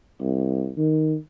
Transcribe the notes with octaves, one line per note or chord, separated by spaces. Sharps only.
C2
D#3